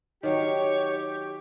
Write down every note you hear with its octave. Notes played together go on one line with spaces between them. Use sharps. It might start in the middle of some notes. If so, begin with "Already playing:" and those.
D#3 F#3 G4 C#5